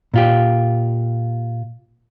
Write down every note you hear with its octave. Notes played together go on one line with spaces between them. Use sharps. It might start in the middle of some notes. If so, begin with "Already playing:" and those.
A#2 F4 G4